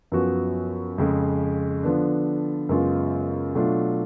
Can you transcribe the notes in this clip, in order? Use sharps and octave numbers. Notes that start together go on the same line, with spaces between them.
F#2 F3 B3 F#4
F2 C#3 G#3
D3 F3 B3 D4
F#2 C#3 G#3 B3 F4
B2 F#3 A3 D4 F4